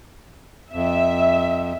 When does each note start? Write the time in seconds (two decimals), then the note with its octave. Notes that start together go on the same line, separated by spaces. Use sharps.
0.73 F2 E5